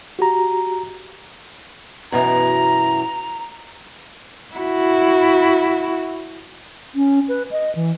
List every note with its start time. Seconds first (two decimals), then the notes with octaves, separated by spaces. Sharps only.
0.19 F#4 G4 A#5
2.12 F#2 B2 E3 A#5
4.55 E4 F#4
6.95 C#4
7.28 B4
7.51 D#5
7.75 E3